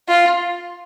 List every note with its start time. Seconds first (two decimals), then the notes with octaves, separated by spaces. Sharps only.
0.08 F4